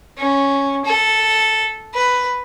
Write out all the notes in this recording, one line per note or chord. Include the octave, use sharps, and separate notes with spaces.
C#4
A4
B4